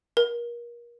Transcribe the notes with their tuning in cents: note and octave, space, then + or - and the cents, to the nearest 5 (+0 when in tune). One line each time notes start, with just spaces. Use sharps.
A#4 +30